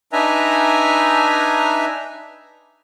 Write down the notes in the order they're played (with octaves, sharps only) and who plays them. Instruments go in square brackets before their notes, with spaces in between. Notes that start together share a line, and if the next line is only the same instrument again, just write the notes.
[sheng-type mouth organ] D4 D#4 B4 E5 G#5 A#5